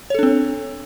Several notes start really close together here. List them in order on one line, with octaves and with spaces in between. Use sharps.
C#5 A4 D4 C4